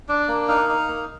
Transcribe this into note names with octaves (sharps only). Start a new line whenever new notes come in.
D4
A#3
D#4 F5
D#4
A#3